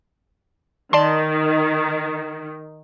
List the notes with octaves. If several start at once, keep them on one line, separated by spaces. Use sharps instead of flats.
D#3 D5 A5 C6